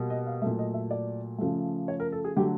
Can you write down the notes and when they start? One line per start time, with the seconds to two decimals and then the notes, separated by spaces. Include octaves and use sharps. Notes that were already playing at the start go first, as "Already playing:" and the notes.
Already playing: B2 G3 A#3
0.10 D#5
0.26 F5
0.42 A#2 F#3 A3 E5
0.59 D#5
0.74 E5
0.91 D5
1.38 C#3 F3 A3
1.88 C#5
2.00 A#4
2.12 A4
2.24 G#4
2.36 D3 F#3 A3 G4